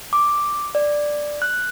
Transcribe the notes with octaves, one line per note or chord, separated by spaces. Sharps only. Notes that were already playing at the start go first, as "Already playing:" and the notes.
D6
D5
F#6